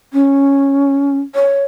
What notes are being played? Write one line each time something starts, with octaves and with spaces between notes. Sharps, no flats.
C#4
C#5